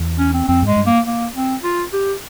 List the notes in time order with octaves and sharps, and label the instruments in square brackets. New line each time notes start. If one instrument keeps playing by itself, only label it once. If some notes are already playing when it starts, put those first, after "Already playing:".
Already playing: [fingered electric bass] E2
[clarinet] C#4
C4
[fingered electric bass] F2 [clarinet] C4
[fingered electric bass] G#2
[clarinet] G#3
[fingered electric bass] G2
[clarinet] A#3
A#3
C4
F4
G4